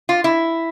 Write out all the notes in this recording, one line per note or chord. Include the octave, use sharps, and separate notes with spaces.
F4
E4